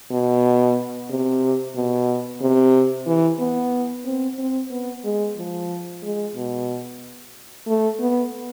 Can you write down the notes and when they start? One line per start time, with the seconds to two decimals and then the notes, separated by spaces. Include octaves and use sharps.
0.11 B2
1.10 C3
1.76 B2
2.41 C3
3.07 E3
3.40 B3
4.05 C4
4.38 C4
4.71 B3
5.04 G#3
5.37 F3
6.03 G#3
6.35 B2
7.67 A3
8.00 B3